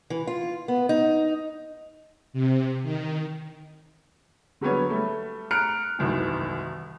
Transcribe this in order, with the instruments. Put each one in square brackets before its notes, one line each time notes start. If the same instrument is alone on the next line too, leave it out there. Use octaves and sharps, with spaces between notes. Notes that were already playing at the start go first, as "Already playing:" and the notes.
[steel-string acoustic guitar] E3
F4
B3
D#4
[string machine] C3
D#3
[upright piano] D3 F#3 G3 B3 C#5
G3 A3
A#5 F6 F#6 C#7 D7
E1 C2 F#2 B2 D#3